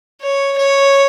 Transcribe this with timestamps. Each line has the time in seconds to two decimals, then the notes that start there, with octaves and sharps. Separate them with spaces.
0.22 C#5
0.58 C#5